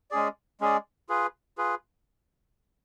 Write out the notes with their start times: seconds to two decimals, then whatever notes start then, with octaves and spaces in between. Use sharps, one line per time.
0.11 G#3 C#4 G#4 D5
0.61 G#3 C#4 G#4 D5
1.09 F4 G#4 B4
1.58 F4 G#4 B4